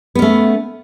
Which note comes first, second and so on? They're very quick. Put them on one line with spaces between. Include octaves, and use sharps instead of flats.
B3 C#4 A3